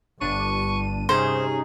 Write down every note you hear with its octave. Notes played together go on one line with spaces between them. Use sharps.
G1 G2 D4 C#6 D#7
C3 C#4 D#4 G#4 C5